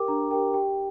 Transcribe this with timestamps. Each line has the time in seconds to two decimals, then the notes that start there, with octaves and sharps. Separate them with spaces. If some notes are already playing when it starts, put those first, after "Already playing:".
Already playing: G4 A#4 G5 D6
0.08 D4 A#5
0.31 G4 A#4 G5
0.54 G4 G5